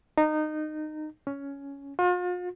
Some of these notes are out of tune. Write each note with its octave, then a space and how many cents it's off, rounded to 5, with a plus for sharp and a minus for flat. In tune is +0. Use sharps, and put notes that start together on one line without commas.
D#4 -20
C#4 +10
F4 +40